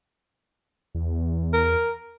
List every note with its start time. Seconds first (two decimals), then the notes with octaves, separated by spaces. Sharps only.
0.95 E2
1.53 A#4